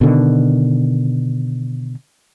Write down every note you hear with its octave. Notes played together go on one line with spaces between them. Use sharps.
B2 D3 D#3